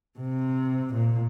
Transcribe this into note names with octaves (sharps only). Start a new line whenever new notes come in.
C3
A#2